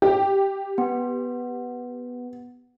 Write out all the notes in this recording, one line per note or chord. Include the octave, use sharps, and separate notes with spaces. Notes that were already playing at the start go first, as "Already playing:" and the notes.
G4
B3